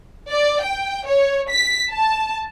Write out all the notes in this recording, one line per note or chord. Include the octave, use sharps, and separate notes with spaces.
D5
G5
C#5
B6
A5